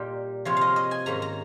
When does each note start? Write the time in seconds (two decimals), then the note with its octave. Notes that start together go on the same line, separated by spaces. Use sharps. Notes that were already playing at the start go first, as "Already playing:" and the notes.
Already playing: A#2 G3 A#3 D#4 G4
0.45 C3 F3 C4 F4 C#5
0.57 D#5 F5
0.76 D#5
0.91 G#5
1.06 G#2 D#3 A#3 C#4 A#5
1.22 A#5